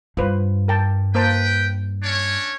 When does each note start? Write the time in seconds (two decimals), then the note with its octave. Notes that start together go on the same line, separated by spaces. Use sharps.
0.17 G2 F4 B4 C5
0.68 A#4 G5 A5
1.15 A#3 B4 C5 G5 A5
2.03 C#4 D4 C#5